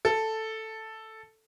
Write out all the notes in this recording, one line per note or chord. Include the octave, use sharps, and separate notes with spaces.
A4